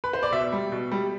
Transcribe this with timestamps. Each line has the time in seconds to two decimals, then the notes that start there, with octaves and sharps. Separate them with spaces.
0.04 B4
0.13 C5
0.23 D5
0.32 B2 E5
0.52 G3
0.72 B2
0.92 G3